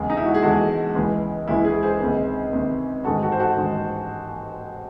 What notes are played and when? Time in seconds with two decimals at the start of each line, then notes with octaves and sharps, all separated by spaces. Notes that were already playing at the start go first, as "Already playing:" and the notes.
Already playing: E1 E2 C#3 G#3
0.10 D#4
0.17 E4
0.26 F#4
0.34 G#4
0.42 E1 E2 C#3 G#3 F#4 A4
0.95 C#2 C#3 E3 G#3
1.48 C#2 C#3 E3 G#3 E4
1.65 E4 G#4
1.83 G#4 C5
2.00 C#2 C3 D#3
2.53 C#2 C3 D#3
3.04 A1 G#2 D#3 G#3 F#4 A4
3.22 F#4 A4
3.32 C5
3.40 F#4 A4
3.57 A1 G#2 D#3 G#3